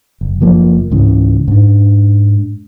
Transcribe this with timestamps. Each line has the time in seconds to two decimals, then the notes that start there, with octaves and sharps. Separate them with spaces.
0.21 F#1
0.41 F#1 F3 A#3
0.91 C#2 G#2 C#3 E3
1.48 G#2 D4